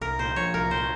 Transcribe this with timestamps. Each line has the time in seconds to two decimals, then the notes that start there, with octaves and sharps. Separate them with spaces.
0.01 C2 A#4
0.19 A#2 C5
0.36 F3 C#5
0.54 C2 A#4
0.71 A#2 C5